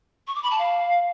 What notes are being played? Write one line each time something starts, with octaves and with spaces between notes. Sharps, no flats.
C#6
D6
B5
A5
F5